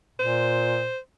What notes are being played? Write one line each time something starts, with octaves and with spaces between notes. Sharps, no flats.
A#2 C5